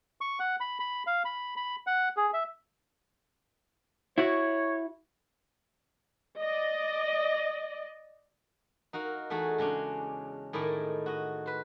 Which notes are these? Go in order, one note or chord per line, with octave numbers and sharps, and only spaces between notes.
C#6
F#5
B5
B5
F5
B5
B5
F#5
G#4
E5
E4 F#4 C#5
D5 D#5
D#4 F#4 A#4 F5
E2 A3 D#4 F#4 G#4 A4
C#3 G#3 C#4 D4
A2 D#3 D#4 E4 G#4 D5
F#4 D#5
B4 C5